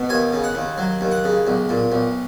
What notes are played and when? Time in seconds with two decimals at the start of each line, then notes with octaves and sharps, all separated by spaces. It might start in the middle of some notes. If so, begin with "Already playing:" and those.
Already playing: B2
0.09 D#2 G#5
0.32 C#3
0.44 F#5
0.55 D#2
0.78 F#3
1.01 D#2
1.12 F#5
1.24 C#3
1.47 B1
1.69 A#2
1.92 B1